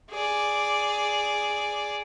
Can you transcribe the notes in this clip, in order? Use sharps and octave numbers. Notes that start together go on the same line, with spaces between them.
G#4 D5